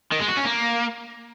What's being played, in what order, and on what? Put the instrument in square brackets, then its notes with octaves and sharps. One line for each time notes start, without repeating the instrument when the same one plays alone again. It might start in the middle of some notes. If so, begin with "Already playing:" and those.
[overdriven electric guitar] D#3
G#3
F#4
C#4
A#3